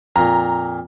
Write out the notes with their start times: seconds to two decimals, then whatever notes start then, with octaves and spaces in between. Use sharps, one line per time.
0.16 F2 A#2 A#5